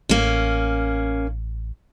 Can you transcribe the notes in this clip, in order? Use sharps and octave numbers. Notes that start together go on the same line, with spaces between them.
A1 A#3 C#4